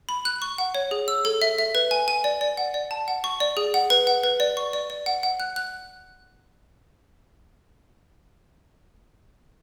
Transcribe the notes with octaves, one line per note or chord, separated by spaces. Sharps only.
B5
F#6
C#6
F#5
C#5
G#4
E6
A4
E5
E5
B4
G#5
G#5
D5
D5
F#5
D5
A5
F#5
C#6
D5
G#4
F#5
B4
F#5
B4
D5
C#6
D5
D5
F#5
F#5
F#6
F#6